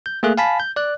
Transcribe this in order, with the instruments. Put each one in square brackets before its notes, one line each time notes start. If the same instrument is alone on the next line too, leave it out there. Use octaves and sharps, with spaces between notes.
[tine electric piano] G6
A3 A#3 G#4 F#6
F5 G#5 A5 B5 B6
G6
D5 F#6